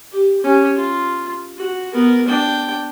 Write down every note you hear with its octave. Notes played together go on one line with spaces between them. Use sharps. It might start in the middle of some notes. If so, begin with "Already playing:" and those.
G4
C#4 G4
F4
F#4
B3 A#4
D4 G5